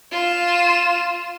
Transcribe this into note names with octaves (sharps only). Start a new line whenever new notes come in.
F4 E7